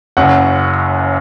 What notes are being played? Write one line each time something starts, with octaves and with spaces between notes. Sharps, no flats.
F#1 F#2 C#3 F#5